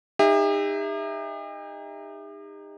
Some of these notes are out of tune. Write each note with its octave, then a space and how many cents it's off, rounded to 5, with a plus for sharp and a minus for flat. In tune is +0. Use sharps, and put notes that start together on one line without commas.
D#4 -10 G4 +45 E5 +0